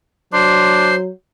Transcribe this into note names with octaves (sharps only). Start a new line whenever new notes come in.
F#3 D4 C5 C6